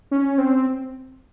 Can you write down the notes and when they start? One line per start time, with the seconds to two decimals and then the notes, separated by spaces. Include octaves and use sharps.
0.11 C#4
0.38 C4